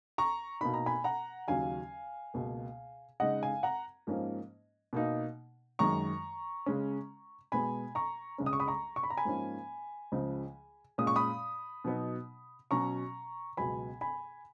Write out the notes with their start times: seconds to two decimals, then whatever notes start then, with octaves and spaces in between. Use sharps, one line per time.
0.18 A#5 C#6
0.61 B2 A#3 D#4 B5
0.74 A#5
0.86 G#5 B5
1.04 F#5 A#5
1.48 D#2 C#3 F#3 C#4 F5 G#5
2.34 C#2 B2 A#3
3.20 C#3 G#3 D#4 D#5 F#5
3.43 F5 G#5
3.63 F#5 A#5
4.07 G#2 F3 A#3 C#4
4.93 B2 A#3 D#4
5.79 F#2 D#3 G#3 A#5 C#6
6.66 C#3 G#3 C#4
7.52 B2 G#3 B3 G#5 B5
7.95 A#5 C#6
8.38 C#2 C#3 G#3 C#4
8.46 D#6
8.53 C#6
8.60 B5 D#6
8.68 A#5 C#6
8.96 C#6
9.03 B5
9.10 A#5
9.17 G#5 B5
9.25 G#2 F3 A#3 C#4
10.12 C#2 C#3 F3
10.98 A#2 G#3 C#4 D#6
11.07 C#6
11.16 B5 D#6
11.84 B2 F#3 B3 D#4
12.71 B2 F#3 C#4 A#5 C#6
13.57 C#2 B2 F#3 B3 G#5 B5
14.01 G#5 B5